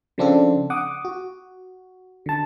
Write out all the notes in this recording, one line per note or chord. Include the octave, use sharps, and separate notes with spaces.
C#3 F3 C4 D4 F4 A4
F#5 D6 D#6
F#4
D3 A5